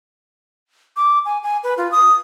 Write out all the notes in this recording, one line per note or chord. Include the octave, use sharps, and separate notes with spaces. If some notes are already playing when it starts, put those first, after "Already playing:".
D6
G#5
G#5
B4
F4
D#6